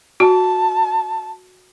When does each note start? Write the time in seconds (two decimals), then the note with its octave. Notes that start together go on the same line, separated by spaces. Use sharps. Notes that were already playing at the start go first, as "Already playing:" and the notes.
0.20 F#4 A5